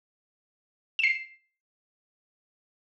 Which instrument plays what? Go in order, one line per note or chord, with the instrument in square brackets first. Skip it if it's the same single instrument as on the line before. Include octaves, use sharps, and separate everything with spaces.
[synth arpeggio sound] C7 E7